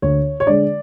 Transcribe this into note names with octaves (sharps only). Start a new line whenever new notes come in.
D2 C#5
C#5
D3 G#3 D5